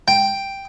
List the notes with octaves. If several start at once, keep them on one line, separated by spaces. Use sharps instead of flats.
G5